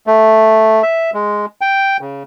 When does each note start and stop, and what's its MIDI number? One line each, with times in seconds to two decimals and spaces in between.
0.07 0.82 57
0.83 1.10 76
1.14 1.46 56
1.61 1.97 79
2.01 2.23 49